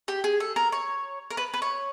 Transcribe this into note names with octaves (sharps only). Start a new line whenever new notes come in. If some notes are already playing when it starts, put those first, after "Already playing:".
G4
G#4
A4
A#4
C#5
A#4
B4
B4
C#5